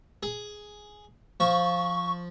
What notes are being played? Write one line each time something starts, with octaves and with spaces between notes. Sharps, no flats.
G#4
F3 C#6